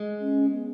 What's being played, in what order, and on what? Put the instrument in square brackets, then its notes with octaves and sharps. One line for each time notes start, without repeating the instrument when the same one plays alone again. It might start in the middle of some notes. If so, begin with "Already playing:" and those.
Already playing: [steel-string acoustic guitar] G#3
[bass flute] C#4
B3